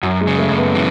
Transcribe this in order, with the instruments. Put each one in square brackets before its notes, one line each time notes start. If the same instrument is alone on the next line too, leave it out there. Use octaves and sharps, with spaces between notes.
[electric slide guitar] F#2 [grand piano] F#3
[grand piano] G#3
[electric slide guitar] C#3
[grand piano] A3
[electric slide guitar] F#2
[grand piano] B3
[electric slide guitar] E3 [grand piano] C#4